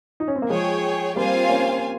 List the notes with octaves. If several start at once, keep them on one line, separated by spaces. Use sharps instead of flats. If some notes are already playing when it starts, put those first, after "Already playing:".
D#4
C#4
C4
A#3
F3 G#3 G#4 C#5 G5
G3 A#3 C4 F4 C5 F5 G#5
A#3 C#4